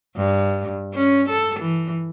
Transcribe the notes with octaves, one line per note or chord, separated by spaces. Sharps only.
G2
C#4
A4
E3